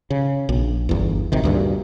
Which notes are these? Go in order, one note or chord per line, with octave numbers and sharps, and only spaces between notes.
C#3
A#1
G1 E2
G#1 C3 D#3
D2 G2 A#2